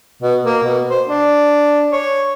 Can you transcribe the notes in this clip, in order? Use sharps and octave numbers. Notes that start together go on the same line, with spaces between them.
B2
A#3
B2
C5
D4
C#5